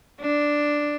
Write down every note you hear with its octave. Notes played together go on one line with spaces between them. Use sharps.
D4